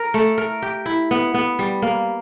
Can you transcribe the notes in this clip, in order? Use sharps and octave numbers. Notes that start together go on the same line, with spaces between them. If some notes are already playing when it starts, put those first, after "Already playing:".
Already playing: A#4
A3
A#4
G4
E4
B3
B3
G3
A#3